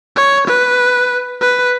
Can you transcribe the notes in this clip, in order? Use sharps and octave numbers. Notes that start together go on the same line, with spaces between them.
C#5
B4
B4